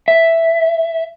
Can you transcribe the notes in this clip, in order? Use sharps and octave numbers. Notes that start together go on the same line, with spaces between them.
E5